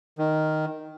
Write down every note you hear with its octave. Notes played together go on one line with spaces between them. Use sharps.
D#3